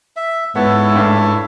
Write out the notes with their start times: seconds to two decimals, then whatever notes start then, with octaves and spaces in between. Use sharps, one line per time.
0.16 E5
0.55 G#2 B3 E4 A4 C#5
0.92 A1 G2